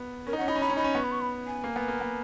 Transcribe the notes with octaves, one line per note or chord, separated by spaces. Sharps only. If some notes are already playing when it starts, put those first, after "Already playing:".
Already playing: B3
C#4 A#4
D#4
C#4 F#5
D#4 B5
C#4
D#4 B5
C#4
D#4 B5
C#4
B3 C#6
B5
C#6
B5
G#5
A#3
B3
A#3
B3